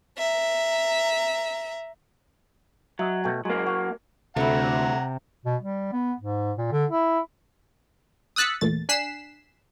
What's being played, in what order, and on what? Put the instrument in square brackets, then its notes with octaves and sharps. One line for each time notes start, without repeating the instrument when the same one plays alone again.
[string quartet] E5 A#5
[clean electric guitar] F#3 [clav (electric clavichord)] D#5 E5
[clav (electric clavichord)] B2 A3 G5
[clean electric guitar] F#3 A#3 [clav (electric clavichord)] G#3
[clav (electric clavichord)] F#4
[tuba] D2 [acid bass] C3 [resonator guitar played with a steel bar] A3 E4 [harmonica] F#5 A#5
[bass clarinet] B2
G3
B3
G#2
A#2
D3
E4
[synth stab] D#6 E6 F#6 A6 B6 C#7
E2 A#2 A3 A6
D4 G#5 F#6 B6 C7 E7